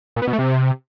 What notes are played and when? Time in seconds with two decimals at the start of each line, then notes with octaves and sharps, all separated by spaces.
0.16 A#2
0.22 B3
0.28 B2
0.33 A3
0.39 C3